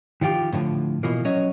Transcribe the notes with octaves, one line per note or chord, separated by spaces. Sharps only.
D#3 F3 F4 G4
A2 D3 E3 F3
B2 E3 F3 A#3
F#3 C#4 C#5 D#5